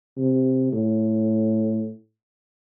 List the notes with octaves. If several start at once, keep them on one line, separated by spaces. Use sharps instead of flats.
C3
A2